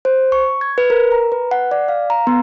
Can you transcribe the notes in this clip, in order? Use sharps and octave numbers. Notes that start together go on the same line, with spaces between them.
C5
C#6
G#6
B4
A#4
A#5
B4
F#5
D5
F5
A#5
B3